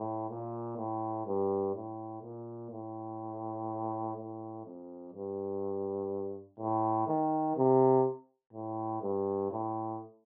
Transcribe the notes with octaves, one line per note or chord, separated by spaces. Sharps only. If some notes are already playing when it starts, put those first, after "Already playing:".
Already playing: A2
A#2
A2
G2
A2
A#2
A2
A2
F2
G2
A2
D#3
C3
A2
G2
A2